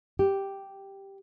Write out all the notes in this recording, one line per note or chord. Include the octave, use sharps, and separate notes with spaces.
G4